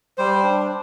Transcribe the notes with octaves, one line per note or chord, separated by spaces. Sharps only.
G3 C5
D4